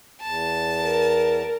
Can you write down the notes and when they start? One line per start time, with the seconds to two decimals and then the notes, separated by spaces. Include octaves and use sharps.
0.22 E2 A5
0.82 A#4